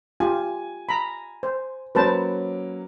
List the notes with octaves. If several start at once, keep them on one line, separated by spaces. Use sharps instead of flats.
F4 G4 G#5
A#5 B5
C5
F#3 A#3 C#4 B4 C5 A5